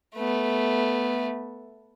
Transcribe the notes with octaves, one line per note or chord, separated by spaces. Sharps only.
A3 B3